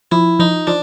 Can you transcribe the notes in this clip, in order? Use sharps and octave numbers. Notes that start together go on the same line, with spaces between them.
F3 E4
F3 D#4
F3 D4